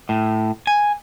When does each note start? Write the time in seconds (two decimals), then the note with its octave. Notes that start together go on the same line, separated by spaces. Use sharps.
0.09 A2
0.67 G#5